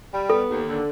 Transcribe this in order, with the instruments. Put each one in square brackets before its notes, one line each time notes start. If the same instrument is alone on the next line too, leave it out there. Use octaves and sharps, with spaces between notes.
[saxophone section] G3
[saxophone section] B3 [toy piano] A4
[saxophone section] D#2
D3